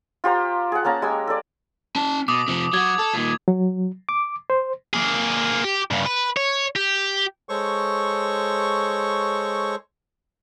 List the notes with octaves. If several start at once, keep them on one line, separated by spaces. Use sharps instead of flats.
F4 G4 C5 A#5
G#4 F#5
A#3 C#4 A5 A#5
G#3 G4 G#5 E6
A4 D5
C#4 A5
B2 D6 D#6
C3 F3
F#3 F#4 G#6
A4
A#2 D#3
F#3
D6
C5
A#3 G#4
G4
G2 C#3
B4
C#5
G4
G#3 A4 C5 C#5 C#6